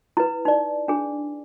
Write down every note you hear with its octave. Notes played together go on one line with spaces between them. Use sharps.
E4 B4
D#4 D5
D4 G#4